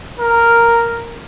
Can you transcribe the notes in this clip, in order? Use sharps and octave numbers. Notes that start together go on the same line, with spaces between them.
A#4